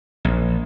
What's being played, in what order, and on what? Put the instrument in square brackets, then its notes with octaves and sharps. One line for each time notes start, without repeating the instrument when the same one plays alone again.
[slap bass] A#1